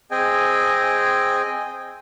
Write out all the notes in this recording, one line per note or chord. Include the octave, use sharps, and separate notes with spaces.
C4 G#4 D#5 G5 G#5